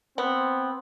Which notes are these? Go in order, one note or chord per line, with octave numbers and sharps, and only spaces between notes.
B3 C4